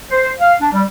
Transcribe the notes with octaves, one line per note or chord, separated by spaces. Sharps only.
C5
F5
D4
G3